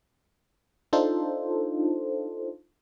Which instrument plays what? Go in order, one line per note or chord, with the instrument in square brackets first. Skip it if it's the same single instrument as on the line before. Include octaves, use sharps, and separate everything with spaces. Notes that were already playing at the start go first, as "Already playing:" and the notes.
[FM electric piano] D4 D#4 F4 A4 C5